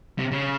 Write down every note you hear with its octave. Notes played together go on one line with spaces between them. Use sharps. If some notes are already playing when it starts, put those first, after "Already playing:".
C3
C#3